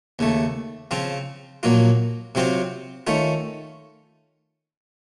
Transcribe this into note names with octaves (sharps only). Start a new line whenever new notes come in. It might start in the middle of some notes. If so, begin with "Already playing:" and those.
D#2 C#3 A3
C#3 F3 C4 F4
A#1 A#2 F#3 A#3 F4
C3 F#3 C4 F4 C5
D#3 A3 C#4 F4